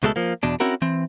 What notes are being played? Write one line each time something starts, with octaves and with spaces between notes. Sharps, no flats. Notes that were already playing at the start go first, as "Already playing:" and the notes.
C#2 B2 G#3 A3 A4
F3 A#3
E2 B2 D4
C4 C#4 E4 F#4 A#4
E3 C4